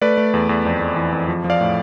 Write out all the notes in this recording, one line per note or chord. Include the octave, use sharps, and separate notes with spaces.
A3 B4 D5
A3
E2
E2
F2
F2
E3
F2
F3
F3
D5 F5
A2